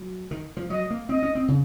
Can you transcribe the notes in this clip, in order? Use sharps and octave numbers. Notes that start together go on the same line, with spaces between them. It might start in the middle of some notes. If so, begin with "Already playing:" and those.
Already playing: F#3
D#3
F3
F#3 D#5
A#3
C4 D#5
C#4
C4
C#3